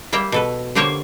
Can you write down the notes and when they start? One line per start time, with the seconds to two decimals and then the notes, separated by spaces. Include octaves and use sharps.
0.12 G3 A#3 E5 G5 A#5
0.32 B2 A4 B4
0.75 D3 A#3 G4 A#4 C5 C#5